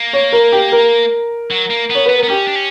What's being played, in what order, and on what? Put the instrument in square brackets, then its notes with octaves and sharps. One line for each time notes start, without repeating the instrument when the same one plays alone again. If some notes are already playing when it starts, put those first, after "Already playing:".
Already playing: [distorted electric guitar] A#3
[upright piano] C#5
A#4
G4
A#4
[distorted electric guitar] F#3
A#3
[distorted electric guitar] B3 [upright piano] C#5
[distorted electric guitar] B3 [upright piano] B4
[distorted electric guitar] B3 [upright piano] A#4
[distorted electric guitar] C#4 [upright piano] G4
[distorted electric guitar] D4
C#4